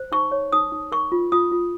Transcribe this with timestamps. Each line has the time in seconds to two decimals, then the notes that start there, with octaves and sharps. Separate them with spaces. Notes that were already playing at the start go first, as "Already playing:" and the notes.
Already playing: C5
0.12 D#4 C#6
0.32 C#5
0.52 D#4 D#6
0.72 D#4
0.92 A#4 C#6
1.12 F4
1.32 F4 D#6
1.52 F4